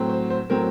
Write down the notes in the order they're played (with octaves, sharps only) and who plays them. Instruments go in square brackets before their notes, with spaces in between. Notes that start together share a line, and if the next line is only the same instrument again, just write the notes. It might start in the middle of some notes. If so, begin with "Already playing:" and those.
Already playing: [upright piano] A2 F#3 C4
C5
C5
A2 F#3 C4 A#4